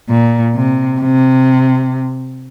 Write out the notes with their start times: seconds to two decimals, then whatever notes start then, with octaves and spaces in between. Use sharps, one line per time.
0.09 A#2
0.55 C3
1.01 C3